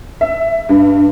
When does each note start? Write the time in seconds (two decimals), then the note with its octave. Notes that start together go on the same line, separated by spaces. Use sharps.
0.21 E5
0.69 G2